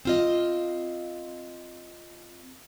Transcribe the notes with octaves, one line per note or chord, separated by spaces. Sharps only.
C4 F4 D#5